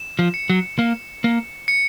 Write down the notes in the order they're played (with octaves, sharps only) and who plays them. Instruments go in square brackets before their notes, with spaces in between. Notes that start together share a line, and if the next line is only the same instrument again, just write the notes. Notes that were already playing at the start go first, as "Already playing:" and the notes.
Already playing: [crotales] E7
[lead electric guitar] F3
[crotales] C#7
[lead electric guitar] F#3
A#3
A#3
[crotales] C#7